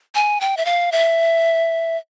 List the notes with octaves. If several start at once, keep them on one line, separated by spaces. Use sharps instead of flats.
G#5
G5
E5
F5
E5